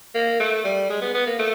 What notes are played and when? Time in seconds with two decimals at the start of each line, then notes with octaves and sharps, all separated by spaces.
0.15 A#3
0.40 A3
0.64 G3
0.89 G#3
1.01 B3
1.14 B3
1.27 A#3
1.39 A3